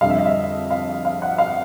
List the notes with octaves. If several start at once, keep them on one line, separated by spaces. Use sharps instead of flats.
F2 D3 G3 F5
E5
D#5
E5
F5
F5
F#5
F5